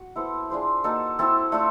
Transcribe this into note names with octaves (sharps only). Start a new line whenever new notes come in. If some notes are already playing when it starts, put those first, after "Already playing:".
Already playing: F#4
B3 E4 A4 C5
D4 F4 G#4 C5
A#3 D#4 F#4 A4
C4 E4 A4
A3 D4 F4 A4